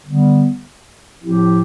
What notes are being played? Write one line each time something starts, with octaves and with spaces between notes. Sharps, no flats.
D3 G3 B3
A2 F3 C4 E4 G4